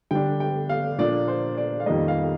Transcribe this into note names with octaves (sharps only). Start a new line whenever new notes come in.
D3 G3 D4 G5
G5
F5
A#2 F3 A#3 D4 D5
C5
D5
F5
F2 D#3 G3 A#3 D#5
F5